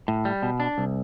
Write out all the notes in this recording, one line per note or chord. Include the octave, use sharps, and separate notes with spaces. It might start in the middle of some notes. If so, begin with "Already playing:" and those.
A2
G3
B2
D4
C2